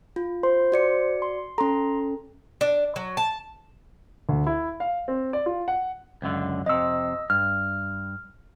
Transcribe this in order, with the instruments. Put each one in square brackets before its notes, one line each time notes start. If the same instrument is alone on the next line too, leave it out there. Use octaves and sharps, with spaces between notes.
[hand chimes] F4
[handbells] C5 C6
[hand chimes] F#4 D5 C#7
[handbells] C6
[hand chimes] C#4 A4 [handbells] A#5 C6
[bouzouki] D4
F#3
A5
[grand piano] D2
E4
F5
C4
D5
F4
F#5
[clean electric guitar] C#2 F#2 D3
[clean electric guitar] F2 C3 [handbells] D#5 E6
[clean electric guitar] G2 [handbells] F6